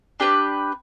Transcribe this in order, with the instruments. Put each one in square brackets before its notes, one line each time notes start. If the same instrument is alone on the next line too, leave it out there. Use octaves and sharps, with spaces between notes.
[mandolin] D4 G4 B4